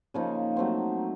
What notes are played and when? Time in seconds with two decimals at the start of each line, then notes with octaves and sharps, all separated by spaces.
0.14 C#3 F3 A#3 D#4
0.56 F#3 A3 C4